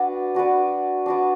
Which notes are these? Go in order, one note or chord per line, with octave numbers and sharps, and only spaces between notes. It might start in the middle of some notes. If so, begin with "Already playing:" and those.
Already playing: D4 F#4 B4 D5
D4 F#4 B4 D5
D4 F#4 B4 D5